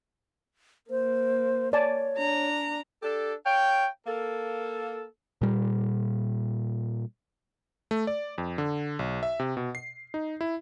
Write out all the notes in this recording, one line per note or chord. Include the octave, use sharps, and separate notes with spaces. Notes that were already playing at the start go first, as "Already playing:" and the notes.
A#3 C5
C#5 D5 G#5 A5
D4 A#5
D4 G4 A4
C#5 F5 G5
A#3 A4
A#2 G3
A3
D5
F2
D3
B1
E5
C3
B2
C7
D#4
E4